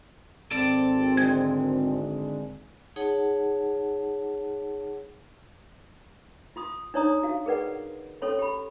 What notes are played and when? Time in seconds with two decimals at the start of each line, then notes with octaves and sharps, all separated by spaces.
0.51 G#1 C4 A4 D5
1.17 D3 G#3 G#6
2.96 D#4 G#4 C#5 F#5 A5
6.56 F4 C6 D#6
6.94 D4 D#4 C#5 D5 A#5 D#6
7.23 F#4 F5
7.46 G#4 A#4 B4 D5 F#5
8.22 C#4 A4 C#5 C6
8.39 G4 B5